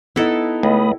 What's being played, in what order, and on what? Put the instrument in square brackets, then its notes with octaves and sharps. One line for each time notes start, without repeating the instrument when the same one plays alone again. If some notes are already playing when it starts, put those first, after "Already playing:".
[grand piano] B3 D#4 [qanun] E4 A4
[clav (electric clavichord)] C#2 [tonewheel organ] A3 B5 D#6